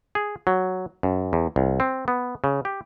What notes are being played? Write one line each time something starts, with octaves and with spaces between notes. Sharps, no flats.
G#4
F#3
F#2
E2
C2
C4
B3
C#3
G4